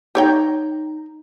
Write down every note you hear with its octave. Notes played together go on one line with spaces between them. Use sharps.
D#4 G4 C#5 G5 A#5